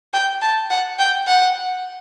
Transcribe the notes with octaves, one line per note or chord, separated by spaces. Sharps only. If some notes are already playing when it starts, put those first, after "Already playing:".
G5
A5
F#5
G5
F#5